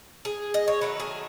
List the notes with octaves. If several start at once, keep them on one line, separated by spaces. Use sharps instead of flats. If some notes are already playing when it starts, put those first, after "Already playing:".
G#4
D#5
C#5
D#3 F#3 A3 B4
G#4